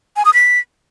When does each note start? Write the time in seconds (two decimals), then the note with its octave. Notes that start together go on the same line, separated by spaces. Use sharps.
0.16 G#5
0.25 D#6
0.34 B6